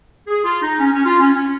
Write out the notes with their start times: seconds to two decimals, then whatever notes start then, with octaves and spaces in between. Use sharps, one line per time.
0.27 G#4
0.44 F4
0.62 D#4
0.80 C#4
0.93 C#4
1.06 F4
1.20 C#4
1.33 C#4